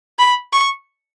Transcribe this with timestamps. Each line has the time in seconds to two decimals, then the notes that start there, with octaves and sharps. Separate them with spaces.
0.19 B5
0.53 C#6